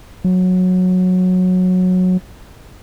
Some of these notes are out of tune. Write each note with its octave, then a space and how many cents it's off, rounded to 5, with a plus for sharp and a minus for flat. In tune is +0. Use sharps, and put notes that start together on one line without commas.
F#3 -15